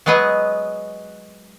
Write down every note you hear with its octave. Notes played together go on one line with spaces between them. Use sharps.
F#3 G#3 B3 G#4 D#5